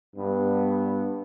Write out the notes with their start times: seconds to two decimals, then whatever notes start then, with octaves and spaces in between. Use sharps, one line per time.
0.16 G2 B3